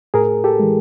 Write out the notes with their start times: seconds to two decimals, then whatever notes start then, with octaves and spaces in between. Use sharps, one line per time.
0.14 A2 G#4 A#4
0.44 G4 A4
0.60 E3 G#3